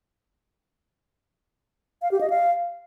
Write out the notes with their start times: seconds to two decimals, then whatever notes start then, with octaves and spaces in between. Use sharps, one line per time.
2.02 F5
2.11 G4
2.21 D#5
2.30 F5